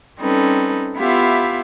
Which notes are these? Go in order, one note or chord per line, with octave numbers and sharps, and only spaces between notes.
G3 C4 C#4 D#4 A4 B4
B3 E4 F4 G4 E5 F5